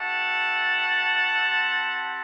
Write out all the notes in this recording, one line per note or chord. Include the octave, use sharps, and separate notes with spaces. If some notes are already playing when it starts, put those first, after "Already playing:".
Already playing: A3 C4 E4 G4 F#5 A5
C4 E4 G4